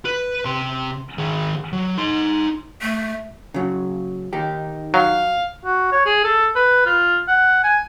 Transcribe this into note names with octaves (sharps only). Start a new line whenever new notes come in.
B4
C3 C6
D#3 G#4
F#3
D#4 C6
A3
C#3 F#3
D#3 D#4 G4
F#3 F5
F#4
C#5
G#4
A4
B4
F4
F#5
G#5